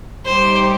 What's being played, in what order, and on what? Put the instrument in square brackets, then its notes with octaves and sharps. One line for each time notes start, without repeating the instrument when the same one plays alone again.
[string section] A2 G3 D#4 G4 [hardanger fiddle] C5